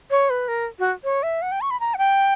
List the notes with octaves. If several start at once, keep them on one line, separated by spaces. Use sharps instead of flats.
C#5
B4
A#4
F#4
C#5
E5
F#5
G5
C#6
B5
A#5
F#5
G5